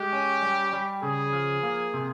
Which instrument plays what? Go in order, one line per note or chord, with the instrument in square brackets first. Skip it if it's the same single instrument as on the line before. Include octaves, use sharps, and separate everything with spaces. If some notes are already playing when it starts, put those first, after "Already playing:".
Already playing: [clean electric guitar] G#3 [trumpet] G4
[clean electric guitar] C#4
G3
G3
[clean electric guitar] C#3 [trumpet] G#4
[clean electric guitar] F3
A#3
C3